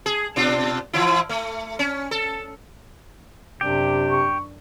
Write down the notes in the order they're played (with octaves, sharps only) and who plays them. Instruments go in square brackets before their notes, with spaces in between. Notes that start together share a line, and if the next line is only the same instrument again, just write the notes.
[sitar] G#4
B2 D4 F4
E3 F3 E4
A3
C#4
A4
[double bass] F#2 D4 [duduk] C3 [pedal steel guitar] G4
[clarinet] C#6